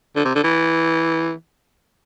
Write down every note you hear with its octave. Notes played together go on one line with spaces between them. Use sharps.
D3
C3
D3
E3